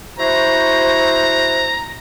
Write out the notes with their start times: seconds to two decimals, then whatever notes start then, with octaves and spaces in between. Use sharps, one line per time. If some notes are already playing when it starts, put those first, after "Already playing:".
0.19 E4 F#4 C5 A#5